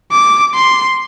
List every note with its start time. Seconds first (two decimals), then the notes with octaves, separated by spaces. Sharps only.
0.12 D6
0.55 C6